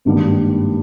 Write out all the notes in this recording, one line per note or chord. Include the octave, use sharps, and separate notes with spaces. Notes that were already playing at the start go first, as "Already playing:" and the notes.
G#1 G2 D#3 G3 A#3